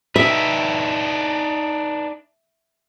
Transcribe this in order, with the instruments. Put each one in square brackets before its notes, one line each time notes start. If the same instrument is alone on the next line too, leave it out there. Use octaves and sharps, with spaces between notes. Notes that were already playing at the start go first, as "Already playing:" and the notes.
[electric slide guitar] D4 D#4 B4 [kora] E5